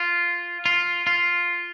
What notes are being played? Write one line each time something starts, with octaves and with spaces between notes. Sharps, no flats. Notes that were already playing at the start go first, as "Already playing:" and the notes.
Already playing: F4
F4
F4